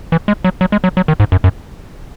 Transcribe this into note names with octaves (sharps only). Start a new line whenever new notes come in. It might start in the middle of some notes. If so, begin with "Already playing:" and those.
E3
G#3
F#3
F#3
G#3
F#3
F#3
D#3
G#2
F#2
F#2